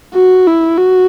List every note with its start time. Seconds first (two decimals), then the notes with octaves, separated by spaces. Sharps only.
0.15 F#4
0.47 E4
0.78 F#4